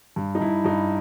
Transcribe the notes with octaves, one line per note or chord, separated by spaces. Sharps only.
G2
D#4
G2 E4
G2 D#4